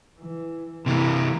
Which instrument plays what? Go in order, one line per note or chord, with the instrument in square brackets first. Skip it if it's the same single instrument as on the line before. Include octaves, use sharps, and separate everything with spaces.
[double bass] E3
[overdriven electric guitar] C3 E3 [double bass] A#3 E4